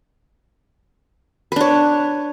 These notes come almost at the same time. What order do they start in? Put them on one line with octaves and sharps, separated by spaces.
B4 D4 C#5